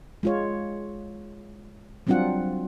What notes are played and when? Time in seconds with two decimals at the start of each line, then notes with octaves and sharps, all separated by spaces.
0.23 G#3 F4 C#5
2.07 F#3 G3 C4 D4 F4 F#5